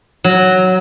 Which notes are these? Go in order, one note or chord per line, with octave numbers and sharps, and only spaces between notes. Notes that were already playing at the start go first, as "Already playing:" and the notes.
F#3